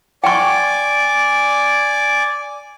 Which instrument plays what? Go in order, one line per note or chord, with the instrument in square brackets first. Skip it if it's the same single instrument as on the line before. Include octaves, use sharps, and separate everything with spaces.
[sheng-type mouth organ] D5 G#5 D6 [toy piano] G5 C#6